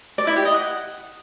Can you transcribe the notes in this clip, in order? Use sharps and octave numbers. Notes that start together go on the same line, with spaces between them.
D5
E4
G4
D#5
F#5